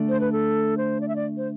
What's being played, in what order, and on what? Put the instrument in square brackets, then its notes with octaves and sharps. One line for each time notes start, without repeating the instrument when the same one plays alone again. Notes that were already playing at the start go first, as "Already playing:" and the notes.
Already playing: [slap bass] D3 A3 D4
[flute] C5
B4
A4
C5
D5
E5
D5
C5